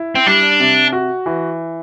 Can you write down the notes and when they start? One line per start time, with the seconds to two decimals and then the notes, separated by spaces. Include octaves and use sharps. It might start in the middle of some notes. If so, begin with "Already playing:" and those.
Already playing: E4
0.15 C4
0.26 G3 D4
0.60 C3
0.92 F#4
1.26 E3